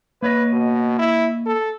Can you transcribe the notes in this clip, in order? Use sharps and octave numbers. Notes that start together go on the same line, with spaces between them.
A#3 B4 C#5 D#5
B2
E4
A4